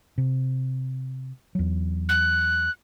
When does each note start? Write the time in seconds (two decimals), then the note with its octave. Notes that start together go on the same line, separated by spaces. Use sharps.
0.18 C3
1.55 E2 F#3
2.09 F#6